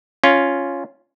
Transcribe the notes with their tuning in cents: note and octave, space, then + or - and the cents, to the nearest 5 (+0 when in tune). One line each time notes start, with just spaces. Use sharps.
C#4 +0 F4 +0